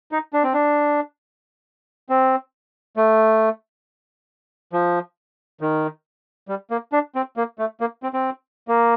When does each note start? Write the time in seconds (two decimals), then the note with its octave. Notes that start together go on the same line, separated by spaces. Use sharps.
0.12 D#4
0.33 D4
0.43 C4
0.54 D4
2.09 C4
2.97 A3
4.73 F3
5.61 D#3
6.48 G3
6.71 A#3
6.92 D4
7.15 C4
7.37 A#3
7.59 A3
7.81 A#3
8.03 C4
8.14 C4
8.68 A#3